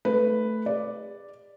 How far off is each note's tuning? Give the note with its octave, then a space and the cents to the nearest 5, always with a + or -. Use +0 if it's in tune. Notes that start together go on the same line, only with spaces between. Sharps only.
A3 +0 B4 +0
G#4 -45 D5 +0